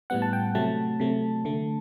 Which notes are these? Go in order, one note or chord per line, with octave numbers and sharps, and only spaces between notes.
A2 G3 B3 F#5
A5
G5
C3 F#3 A3 A5
C3 F#3 A3
D3 A3